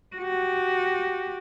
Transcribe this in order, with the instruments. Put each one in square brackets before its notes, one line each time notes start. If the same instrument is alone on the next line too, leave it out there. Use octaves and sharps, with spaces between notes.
[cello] F#4 G4